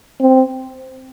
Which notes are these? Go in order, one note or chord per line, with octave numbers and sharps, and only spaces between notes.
C4